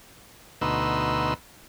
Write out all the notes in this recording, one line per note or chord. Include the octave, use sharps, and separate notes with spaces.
D2 B2 D#4 B4 C6 E6